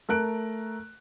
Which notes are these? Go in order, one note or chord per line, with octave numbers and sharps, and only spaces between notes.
A3 A#4 F#6 D7